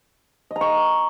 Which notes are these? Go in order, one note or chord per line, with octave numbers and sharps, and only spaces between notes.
D#5
A#5
C#6